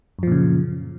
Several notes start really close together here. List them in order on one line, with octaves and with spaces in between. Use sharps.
F#2 F3 A#2 C#3